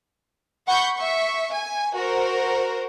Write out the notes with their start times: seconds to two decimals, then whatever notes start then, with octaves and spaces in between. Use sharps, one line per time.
0.68 F#5 B5 C#6 G6
0.97 E5 C#6
1.52 G#5
1.96 F#4 A#4 C5